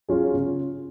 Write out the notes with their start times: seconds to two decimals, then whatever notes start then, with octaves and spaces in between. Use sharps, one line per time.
0.08 F#3 C#4 F4 G#4
0.34 C#3